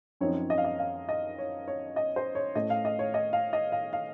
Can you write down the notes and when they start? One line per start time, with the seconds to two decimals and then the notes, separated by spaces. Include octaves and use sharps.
0.21 F#2 F3 C4 D#4 C#5
0.50 D#5
0.58 F5
0.65 D#5
0.79 F5
1.09 D#5
1.38 C#5
1.68 C#5
1.96 D#5
2.16 C5
2.35 C#5
2.55 A2 A3 C#4 D#5
2.70 F5
2.85 D#5
2.99 C#5
3.14 D#5
3.33 F5
3.53 D#5
3.72 F5
3.93 F5